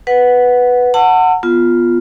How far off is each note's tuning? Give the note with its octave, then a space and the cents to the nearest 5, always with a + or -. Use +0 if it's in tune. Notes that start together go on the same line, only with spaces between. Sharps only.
B4 +0 F#5 -5
F#5 +0 A5 +40 E6 +35
B3 -5 F4 +0